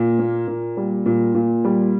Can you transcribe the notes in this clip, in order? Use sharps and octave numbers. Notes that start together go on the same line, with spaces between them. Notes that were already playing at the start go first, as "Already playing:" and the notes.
Already playing: A#2
A#3
A#2
G3
A#2
A#2
G3